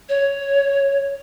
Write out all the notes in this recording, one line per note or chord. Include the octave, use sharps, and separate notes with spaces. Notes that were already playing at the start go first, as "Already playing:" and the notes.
C#5